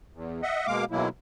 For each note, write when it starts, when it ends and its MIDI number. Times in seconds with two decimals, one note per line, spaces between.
0.13 0.41 40
0.43 0.67 75
0.43 0.67 76
0.43 0.67 78
0.67 0.85 47
0.67 0.85 56
0.67 0.85 58
0.67 0.85 77
0.67 0.85 86
0.91 1.09 47
0.91 1.09 51
0.91 1.09 54
0.91 1.09 56
0.91 1.09 58
0.91 1.09 64